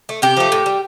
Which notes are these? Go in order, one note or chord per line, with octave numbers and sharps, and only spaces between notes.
A3
C3 G4
F3 A3
A2
G3